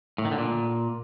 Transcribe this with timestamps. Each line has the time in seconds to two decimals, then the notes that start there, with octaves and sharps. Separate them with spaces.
0.18 A2
0.25 D#3
0.32 D3
0.38 A#2